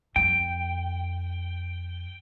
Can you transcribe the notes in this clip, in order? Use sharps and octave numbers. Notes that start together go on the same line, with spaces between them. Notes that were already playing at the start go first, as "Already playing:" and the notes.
F2 G5